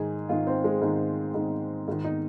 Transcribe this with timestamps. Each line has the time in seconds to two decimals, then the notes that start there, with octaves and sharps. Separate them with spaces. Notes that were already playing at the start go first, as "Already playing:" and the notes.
Already playing: G#2 D#3 G#4
0.29 G#2 D#3 F4
0.47 C4
0.64 G#3
0.82 G#2 D#3
1.34 G#2 D#3
1.88 G#2 D#3
2.04 D#4